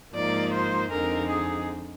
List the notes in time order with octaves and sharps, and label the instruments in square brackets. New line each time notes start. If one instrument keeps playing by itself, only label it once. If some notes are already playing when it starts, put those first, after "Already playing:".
[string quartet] G#2 F3 A#3 D#4 [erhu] D5
[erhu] C5
[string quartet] F2 D3 G#3 C4 D#4 [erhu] A#4
[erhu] G#4